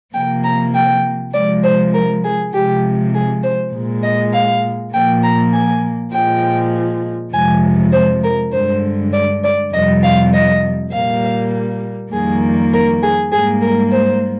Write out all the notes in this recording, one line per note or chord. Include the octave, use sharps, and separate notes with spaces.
C3 F3 A#3 G5
A#5
G5
C3 F3 G#3 D5
C5
A#4
G#4
C3 F3 G#3 G4
G#4
C5
A#2 G#3
D#5
F5
A#2 F3 A#3 G5
A#5
G#5
A#2 F3 G#3 G5
F2 C3 F3 G#3 G#5
C5
A#4
G2 D3 G#3 C5
D5
D5
F2 C3 G3 D#5
F5
D#5
A#2 G3 A#3 F5
F2 D#3 G3 A#3 G#4
A#4
G#4
G#2 G3 A#3 G#4
A#4
C5